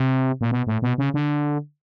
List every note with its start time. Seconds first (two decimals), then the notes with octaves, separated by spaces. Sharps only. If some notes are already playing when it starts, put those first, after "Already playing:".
Already playing: C3
0.41 A#2
0.51 B2
0.67 A2
0.82 B2
0.98 C#3
1.14 D3